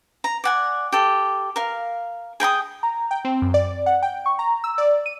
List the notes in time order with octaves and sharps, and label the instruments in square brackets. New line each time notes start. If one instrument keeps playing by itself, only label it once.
[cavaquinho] A#5
D5 F#5 G#5
G4 A4
A#4 F5
G#4 G5 A#5 D#6
[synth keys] A#5
G5
C4
F#2
D5
F#5
G5
C#6
A#5
E6
D5
D#7